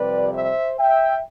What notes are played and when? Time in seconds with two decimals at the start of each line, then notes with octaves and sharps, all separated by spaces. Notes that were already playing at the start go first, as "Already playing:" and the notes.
Already playing: F2 C3 G3 B4 D5
0.33 C5 E5
0.79 E5 G5